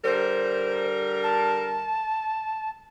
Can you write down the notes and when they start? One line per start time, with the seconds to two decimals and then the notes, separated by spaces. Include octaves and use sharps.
0.04 D3 G3 A#4 C5
1.23 A5